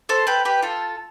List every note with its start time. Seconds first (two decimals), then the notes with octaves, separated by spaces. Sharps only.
0.09 A4 C5
0.27 G4 B4
0.45 G4 B4
0.62 F4 A4